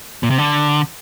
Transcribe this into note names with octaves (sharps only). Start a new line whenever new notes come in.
A#2
C3
D3